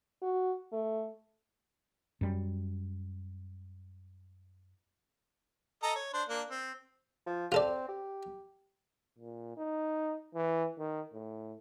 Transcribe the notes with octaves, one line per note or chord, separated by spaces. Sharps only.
F#4
A3
F#2 G3
A4 D#5 A#5
C#5
D4 C5
A#3 D4
C4
F3
C4 F4 A4 D5
G4
A#2
D#4
E3
D#3
A2